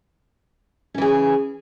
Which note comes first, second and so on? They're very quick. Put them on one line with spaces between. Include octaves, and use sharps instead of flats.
C#4 E3 G#4